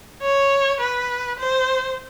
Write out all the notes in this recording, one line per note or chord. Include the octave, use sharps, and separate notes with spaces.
C#5
B4
C5